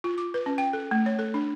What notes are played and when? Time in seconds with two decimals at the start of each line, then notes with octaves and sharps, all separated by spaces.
0.04 F4
0.18 D6
0.34 B4
0.46 C#4
0.58 G5
0.73 A4
0.91 A3
1.06 C#5
1.19 A4
1.34 D4